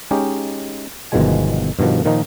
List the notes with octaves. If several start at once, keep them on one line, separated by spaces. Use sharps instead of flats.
G#3 C#4 D#4 G4
G1 B2 D#3 F3 G#3 G#5
G2 B2 D#3 F3
A#2 D#3 F3 D#4